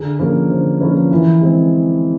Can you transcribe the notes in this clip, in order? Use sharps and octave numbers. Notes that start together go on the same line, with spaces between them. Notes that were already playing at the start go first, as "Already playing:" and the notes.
Already playing: D3 G#4
F3 A#3 C#4 A#4
D3 C5
F3 A#3 C#4 B4
E3 A#4
G#3 C4 G#4